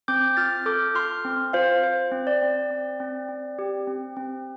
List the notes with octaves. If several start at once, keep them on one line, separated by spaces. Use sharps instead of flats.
C4 D6 G6
F4 F6 A6
A4 D6 G6
F4 C6 F6
C4
F4 C5 F5
F4 C5
C4
D5
C4
C4
C4
C4
G4
C4
C4